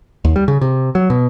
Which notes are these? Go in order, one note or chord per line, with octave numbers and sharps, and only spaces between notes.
D#2
G3
C#3
C3
F#3
B2